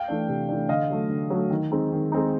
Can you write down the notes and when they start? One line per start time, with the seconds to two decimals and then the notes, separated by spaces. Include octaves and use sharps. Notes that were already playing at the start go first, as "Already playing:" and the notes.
Already playing: F5 G5
0.08 E3 A3 D4
0.28 C3
0.49 E3 A3 D4
0.69 D3 D#5 F5
0.90 F#3 A3
1.10 D3
1.30 F#3 A3
1.50 D#3
1.71 G#3 C4 D#4
1.92 D#3
2.12 G#3 C4 D#4